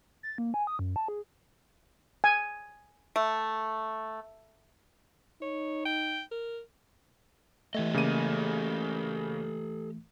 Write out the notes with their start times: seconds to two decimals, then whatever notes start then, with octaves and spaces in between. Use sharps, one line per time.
0.23 A6
0.38 A#3
0.54 G#5
0.67 D#6
0.79 F#2
0.96 A5
1.08 G#4
2.24 G#5
3.16 A3
5.42 D#4 C#5
5.85 G5
6.32 A#4
7.75 E3 A3 G4 A4 D#5
7.94 C#3 A#3 D#7